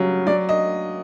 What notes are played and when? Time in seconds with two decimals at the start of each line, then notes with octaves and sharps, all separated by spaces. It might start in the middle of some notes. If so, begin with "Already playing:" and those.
Already playing: C#3 F#3 G3
0.27 F#3 D5
0.49 D#5